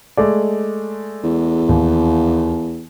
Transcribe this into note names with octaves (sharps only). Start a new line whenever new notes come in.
G#3 A3 D5
E2
D#2